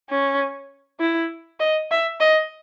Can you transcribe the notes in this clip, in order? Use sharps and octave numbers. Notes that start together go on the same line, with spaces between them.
C#4
E4
D#5
E5
D#5